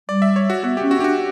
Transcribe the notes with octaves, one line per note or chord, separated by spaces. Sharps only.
G3 D5
E5
C#5
F#4
B3 F#4
G4
C#4
F#4
D4 F#4 G4